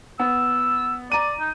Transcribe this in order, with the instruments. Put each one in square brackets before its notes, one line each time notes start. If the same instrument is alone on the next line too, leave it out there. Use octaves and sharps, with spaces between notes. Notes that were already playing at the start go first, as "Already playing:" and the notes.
[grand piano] B3 [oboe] E6
[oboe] D5 [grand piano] A#5 D#7
[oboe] D#4